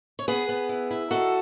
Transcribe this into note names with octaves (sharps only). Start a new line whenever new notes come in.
C#5
B3 G#4 B4
B3
E4
E4
D#3 F#4 A4